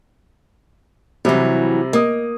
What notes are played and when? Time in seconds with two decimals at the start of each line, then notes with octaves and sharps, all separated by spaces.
1.25 C3 E3 F#3 G3
1.93 A#3 D#5 D#6